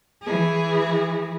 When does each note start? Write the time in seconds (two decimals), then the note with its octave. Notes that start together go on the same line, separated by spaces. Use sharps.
0.23 E3 G#4